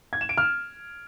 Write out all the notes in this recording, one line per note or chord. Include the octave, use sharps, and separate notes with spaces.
G#6
E7
D7
F6